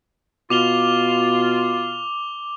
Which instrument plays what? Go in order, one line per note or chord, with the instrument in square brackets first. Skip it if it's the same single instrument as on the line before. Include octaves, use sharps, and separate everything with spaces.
[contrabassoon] B2 [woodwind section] F4 [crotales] D6 F7 G7